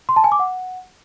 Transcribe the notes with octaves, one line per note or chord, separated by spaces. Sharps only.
C6
A5
G#5
D6
F#5